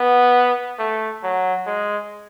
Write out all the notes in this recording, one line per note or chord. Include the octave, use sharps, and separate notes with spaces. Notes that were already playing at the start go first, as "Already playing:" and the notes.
Already playing: B3
A3
F#3
G#3